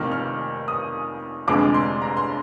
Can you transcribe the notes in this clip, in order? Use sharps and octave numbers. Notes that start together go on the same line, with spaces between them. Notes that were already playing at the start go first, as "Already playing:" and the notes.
Already playing: F1 F2 D#3 A#3 F6
F6
D#6
F1 F2 D3 G#3 D6
C6
A#5
C6